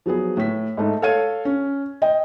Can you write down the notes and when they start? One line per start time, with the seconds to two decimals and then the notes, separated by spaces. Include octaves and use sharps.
0.06 F3 F#3 B3 G#4
0.37 A2 B6
0.77 G#2 A3 D#4
1.02 A4 C#5 F5 G#6 D#7
1.45 C#4
2.02 D#5 G5